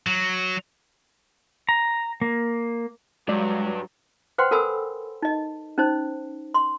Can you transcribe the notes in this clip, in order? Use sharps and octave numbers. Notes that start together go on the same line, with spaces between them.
F#3
A#5
A#3
G2 F#3 G#3 D5
B4 C5 F#5 G5 C6
A4 A#4 F#5 G#5 B5 E6
D#4 D#5
C#4 D#4 C5
C6